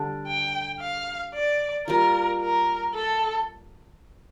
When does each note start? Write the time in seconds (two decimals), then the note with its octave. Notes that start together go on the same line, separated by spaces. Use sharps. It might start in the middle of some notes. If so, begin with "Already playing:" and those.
Already playing: D3 G3 D4
0.27 G5
0.80 F5
1.34 D5
1.88 G3 A#3 F4 A#4
2.41 A#4
2.94 A4